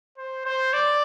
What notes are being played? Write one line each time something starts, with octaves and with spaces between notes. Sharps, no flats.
C5
C5
D5